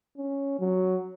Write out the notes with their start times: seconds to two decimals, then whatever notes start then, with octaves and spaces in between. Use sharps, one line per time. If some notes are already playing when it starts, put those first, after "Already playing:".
0.18 C#4
0.60 F#3